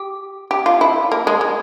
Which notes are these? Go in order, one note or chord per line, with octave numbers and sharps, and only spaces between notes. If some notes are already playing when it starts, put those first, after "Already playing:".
Already playing: G4
G4
F4
E4
A#3
G#3
G#3